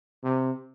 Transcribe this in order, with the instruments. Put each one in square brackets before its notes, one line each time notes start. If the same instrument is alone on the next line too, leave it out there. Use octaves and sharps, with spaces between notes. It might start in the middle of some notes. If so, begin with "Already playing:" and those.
[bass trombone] C3